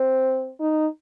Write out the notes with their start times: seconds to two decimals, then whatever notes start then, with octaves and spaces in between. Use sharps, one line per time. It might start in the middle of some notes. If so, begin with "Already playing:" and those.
Already playing: C4
0.60 D#4